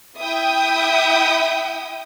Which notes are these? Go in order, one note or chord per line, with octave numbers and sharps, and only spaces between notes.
E4 E5 G5 D#6